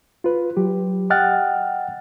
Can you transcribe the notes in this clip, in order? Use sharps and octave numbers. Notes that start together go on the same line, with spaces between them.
F4 B4
F#3 G4
D#5 F#5 G5 F6 F#6 A6